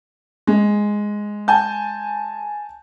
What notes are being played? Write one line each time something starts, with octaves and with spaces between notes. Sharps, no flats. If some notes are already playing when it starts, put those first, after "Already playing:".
G#3
G#5 A5 G6